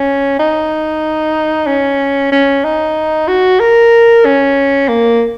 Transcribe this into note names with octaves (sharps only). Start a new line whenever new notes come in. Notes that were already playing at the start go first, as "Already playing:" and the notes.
Already playing: C#4
D#4
C#4
C#4
D#4
F#4
A#4
C#4
A#3